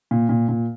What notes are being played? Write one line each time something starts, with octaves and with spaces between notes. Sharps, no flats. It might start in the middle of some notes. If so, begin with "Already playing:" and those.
A#2
A#2
A#2